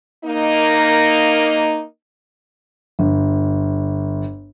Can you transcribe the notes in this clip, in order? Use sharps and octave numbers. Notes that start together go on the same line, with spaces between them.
A#3 D#4
G1